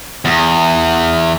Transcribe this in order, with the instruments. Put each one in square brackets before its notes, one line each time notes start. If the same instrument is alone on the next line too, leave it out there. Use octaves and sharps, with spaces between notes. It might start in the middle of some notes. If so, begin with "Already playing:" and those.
[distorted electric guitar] E2